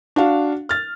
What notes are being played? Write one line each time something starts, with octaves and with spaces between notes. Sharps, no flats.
D4 F#4 F5
F6 A6